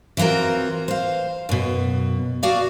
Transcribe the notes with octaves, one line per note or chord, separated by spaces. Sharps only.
E3 C4 F4 F#4 A#4
C5 F5
F#2 B2
F#4 G#4 D5 F5